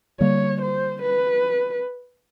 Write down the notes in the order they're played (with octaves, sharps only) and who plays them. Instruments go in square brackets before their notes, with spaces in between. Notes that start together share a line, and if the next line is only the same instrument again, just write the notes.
[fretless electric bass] D3 G3 A#3 [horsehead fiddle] C#5
[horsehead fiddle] C5
B4